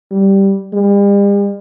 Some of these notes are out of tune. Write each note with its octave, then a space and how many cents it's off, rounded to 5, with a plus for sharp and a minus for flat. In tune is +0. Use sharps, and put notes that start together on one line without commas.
G3 -5
G3 +45